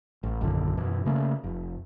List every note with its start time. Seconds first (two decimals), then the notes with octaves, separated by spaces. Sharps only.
0.23 A1
0.41 D#1 A#1 F#2 D3
0.77 F#2 B2 E3
1.06 C#3 A3 A#3
1.44 F1